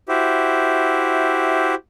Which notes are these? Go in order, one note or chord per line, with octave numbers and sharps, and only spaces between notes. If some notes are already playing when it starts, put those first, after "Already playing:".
E4 F#4 G4 C5 E5